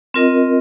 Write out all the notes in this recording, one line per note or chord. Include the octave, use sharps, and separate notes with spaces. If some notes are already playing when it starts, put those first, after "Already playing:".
C4 F4 A#4 D#5